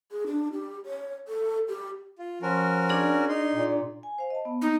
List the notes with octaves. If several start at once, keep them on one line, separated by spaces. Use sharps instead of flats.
G#4
D4
G4
C#5
A4
G4
F4
F3 C#4 F#4 A#4
D4 G#4 D5
D#4 C6
A#2
G#5
C5 F5
D#5 A5
B3
A#3 D#4